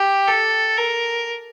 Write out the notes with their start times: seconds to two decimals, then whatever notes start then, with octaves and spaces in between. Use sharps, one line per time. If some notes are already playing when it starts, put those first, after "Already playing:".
Already playing: G4
0.27 A4
0.77 A#4